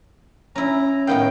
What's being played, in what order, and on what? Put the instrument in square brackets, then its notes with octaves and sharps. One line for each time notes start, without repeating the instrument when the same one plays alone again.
[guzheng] C#4 E4 [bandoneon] A#5
[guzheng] A2 B3 F5 [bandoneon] D#3 G5